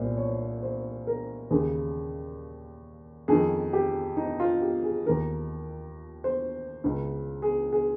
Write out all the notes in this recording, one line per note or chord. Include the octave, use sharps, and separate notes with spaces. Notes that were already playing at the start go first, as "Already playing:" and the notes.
Already playing: C2 A#2 C5
C#5
C5
A#4
D#2 C#3 G#4
F2 D#3 G#4
G4
D#4
F4
G4
G#4
D#2 D#3 A#4
C5
C#2 C#3
G#4
G#4